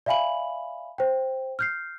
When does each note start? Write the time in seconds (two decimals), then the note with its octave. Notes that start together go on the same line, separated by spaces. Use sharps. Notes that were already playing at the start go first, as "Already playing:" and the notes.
0.06 D5 E5 F5 G#5 B5 F#7
0.98 C5 G5
1.59 F6 G6 C7